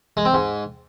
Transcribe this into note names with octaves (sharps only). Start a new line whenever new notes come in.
G#3
C4
G#2